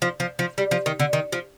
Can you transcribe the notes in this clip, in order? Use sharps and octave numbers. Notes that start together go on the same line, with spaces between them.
F3
F3
F3
G3
F3
D#3
D3
D#3
F3